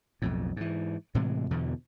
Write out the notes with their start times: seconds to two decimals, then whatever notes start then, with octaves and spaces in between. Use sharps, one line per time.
0.22 B1 F2 A2
0.56 G#2 E3
1.15 A2 C3 E3 G#3
1.50 E2 B2 D3 E3